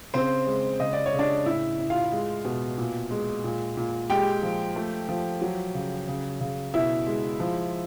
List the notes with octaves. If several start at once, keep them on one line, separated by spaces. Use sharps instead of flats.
C#3 C4 C5
G#3
C#3 D#5
D5
C#5
C#3
D4 D5
A2 E4 E5
A2
F4 F5
G#3
B2
A#2
G#3
A#2
A#2
G#3 G4 G5
F3
A3
F3
F#3
C#3
C#3
C#3
B2 E4 E5
G#3
F3